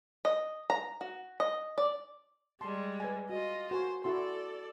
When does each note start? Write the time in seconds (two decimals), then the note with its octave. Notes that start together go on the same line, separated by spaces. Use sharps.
0.25 D#5
0.70 A#5
1.01 F#4
1.40 D#5
1.78 D5
2.61 G3 G#3 A5 C6
3.00 B4 G#5
3.30 F4 F#4 D#5
3.71 F#4 A#4 C5 G#5
4.04 E4 F#4 A4 D5 C6